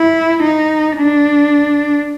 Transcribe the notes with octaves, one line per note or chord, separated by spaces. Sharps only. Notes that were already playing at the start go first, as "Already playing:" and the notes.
Already playing: E4
D#4
D4